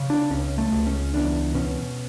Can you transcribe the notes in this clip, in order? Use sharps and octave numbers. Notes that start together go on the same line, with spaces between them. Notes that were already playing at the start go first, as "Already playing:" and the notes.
Already playing: C#3
D4
C#2 C#4
A3
C#2
C#4
E2 D4
B2 C#4